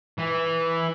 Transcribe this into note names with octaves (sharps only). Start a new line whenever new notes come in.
E3